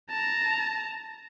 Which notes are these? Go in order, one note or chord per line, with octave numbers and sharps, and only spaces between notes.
A5 A#5